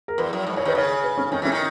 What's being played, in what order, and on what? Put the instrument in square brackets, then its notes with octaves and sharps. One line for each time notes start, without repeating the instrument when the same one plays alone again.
[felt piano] A#4
[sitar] E2 [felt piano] B4
[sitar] F#2
G#2
[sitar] A#2 [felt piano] C#5
[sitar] D#2 D#3 [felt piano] B4
[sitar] C#3 [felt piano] C#5
[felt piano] B4
C#4
[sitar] D#3 [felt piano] C#4
[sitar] E3 [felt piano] C#4
[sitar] D#3